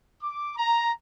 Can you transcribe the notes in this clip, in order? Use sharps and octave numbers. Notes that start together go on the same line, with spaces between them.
D6
A#5